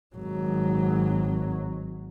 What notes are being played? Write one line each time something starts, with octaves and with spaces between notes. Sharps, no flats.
G#1 F#3